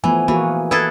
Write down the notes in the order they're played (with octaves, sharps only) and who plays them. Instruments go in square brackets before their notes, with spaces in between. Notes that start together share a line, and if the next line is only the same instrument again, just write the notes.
[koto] E3 [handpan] F3 A3 B3 [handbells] G#5
[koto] E3 [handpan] A#3 F#4 G#4
[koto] E4 G#4 A4 [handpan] B4